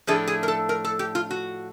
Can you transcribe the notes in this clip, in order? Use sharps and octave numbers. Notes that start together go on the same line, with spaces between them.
A2 F3 A3 D4 G#4
G#4
A#4
A4
A#4
A4
G4
F4
F#4